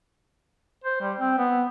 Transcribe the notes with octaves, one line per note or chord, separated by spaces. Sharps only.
C5
G3
C4
B3